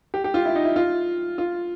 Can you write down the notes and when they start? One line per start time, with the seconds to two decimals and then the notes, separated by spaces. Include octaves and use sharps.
0.14 G4
0.24 G4
0.34 F4
0.45 E4
0.55 D#4
0.65 E4
0.76 F4
1.38 F4